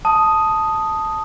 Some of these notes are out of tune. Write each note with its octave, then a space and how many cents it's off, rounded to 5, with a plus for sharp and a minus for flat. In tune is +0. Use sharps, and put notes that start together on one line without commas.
A5 +0 D#6 +0